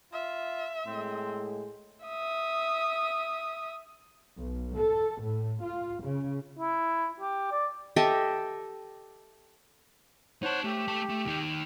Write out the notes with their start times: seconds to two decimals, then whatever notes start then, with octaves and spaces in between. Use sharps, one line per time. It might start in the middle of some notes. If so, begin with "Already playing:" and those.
0.13 F4 E5
0.87 A2 G#3 C4
2.06 E5 D#6
4.38 B1
4.75 A4
5.22 A2
5.63 F4
6.03 C#3
6.59 E4
7.21 G4
7.52 D5
7.96 G4 A4 D#5 E5
10.43 D#4 C5 C#5 F#5 A5
10.64 A3 G4
10.88 A3 A5
11.10 A3
11.25 D#2 D#3